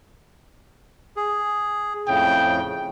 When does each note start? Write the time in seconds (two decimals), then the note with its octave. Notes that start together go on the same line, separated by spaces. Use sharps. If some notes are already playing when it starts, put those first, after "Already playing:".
1.16 G#4
2.08 F2 A2 C#3 G5